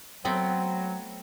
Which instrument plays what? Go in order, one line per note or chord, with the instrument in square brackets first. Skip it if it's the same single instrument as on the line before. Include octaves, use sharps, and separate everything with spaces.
[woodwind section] F#3 [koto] A3 B3 C4 [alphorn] C5 [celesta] G5